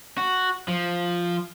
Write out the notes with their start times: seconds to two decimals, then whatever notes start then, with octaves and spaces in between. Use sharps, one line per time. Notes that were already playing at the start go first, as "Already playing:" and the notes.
0.18 F#4
0.68 F3